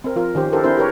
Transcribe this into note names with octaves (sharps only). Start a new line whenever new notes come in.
C4 A#4
F3 F4 A#4
D#3 C#4 G4 C5
D4 E4 G4 A4 A#4 C5
C4 D4 E4 A#4 C5
G4 G#4 A#4 B4 C#5